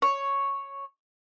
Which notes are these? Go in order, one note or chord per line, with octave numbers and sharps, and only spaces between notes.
C#5